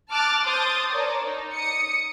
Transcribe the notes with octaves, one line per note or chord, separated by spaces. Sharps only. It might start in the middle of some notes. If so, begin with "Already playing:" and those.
A5 D6 F6 F#6 A6
C5 C6 D#6 G6 A6
A#4 C#5 D5 A5
D#4
D#6 C#7